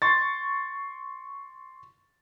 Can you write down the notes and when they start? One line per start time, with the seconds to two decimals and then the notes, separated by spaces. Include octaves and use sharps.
0.02 C6 C#6 A6